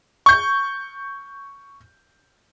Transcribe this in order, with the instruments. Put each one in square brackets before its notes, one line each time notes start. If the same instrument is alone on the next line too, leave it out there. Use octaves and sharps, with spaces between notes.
[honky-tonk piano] C#6 G6